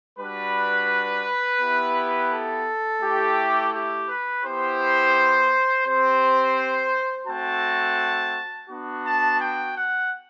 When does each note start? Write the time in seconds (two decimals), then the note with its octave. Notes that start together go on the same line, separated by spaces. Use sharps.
0.18 G3 D4 F#4 B4
1.60 B3 E4 G4
2.32 A4
3.02 A3 E4 G4
3.73 G4
4.08 B4
4.43 B3 E4 G4 C5
5.86 C4 G4 C5
7.27 A3 C4 F#4 A5
8.69 B3 D4 F#4
9.05 A5
9.40 G5
9.76 F#5